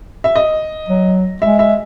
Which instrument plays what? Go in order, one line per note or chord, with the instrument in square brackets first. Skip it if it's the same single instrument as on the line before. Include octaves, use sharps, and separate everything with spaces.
[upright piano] E5
D#5
[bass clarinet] F#3
[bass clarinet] G#3 [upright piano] E5
[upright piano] E5